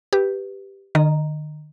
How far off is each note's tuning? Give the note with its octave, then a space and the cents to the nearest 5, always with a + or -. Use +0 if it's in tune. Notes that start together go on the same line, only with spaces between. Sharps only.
G4 +0 B4 +0
D#3 -45 D#5 +0 A#5 +0